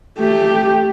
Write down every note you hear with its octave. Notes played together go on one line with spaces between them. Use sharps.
A3 G4